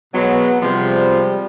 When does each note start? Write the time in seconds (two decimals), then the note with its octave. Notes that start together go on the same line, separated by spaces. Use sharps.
0.14 B2 F#3 G#3 B3
0.62 C3 F3 G3 G#3